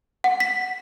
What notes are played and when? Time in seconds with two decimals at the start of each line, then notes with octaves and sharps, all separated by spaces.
0.24 F#5
0.40 B6